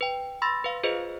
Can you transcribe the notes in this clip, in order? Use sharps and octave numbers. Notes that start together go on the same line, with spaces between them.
B4 G5
B5 C6 E6 A6 A#6
B4 F5
F4 G#4 B4 C5 D#5